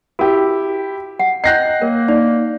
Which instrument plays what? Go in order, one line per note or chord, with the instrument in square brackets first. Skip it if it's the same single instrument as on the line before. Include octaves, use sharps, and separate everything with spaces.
[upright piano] E4 G4 [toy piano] F#4 A#4
[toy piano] F#5
[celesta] D#5 G5 G6 [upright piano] F#6 A#6 C7
[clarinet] A#3 [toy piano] A#4 C#5
[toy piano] D#4 [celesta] D5